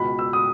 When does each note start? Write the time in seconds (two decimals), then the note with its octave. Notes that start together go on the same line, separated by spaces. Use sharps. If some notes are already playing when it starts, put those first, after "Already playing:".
Already playing: C#2 B2 B5
0.19 E6
0.33 D#6